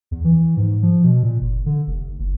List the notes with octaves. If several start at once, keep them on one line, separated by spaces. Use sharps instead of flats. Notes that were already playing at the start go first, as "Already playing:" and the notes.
E2
E3
G#2
F3
B2
A#2
F#1
D3
F1
F#1